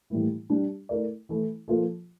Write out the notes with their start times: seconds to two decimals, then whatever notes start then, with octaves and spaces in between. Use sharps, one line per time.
0.10 A2 E3 G3 A#3 E4
0.50 G3 D4 G4
0.89 A3 E4 A#4 D5
1.29 E3 A3 E4
1.68 F3 A#3 F4 A4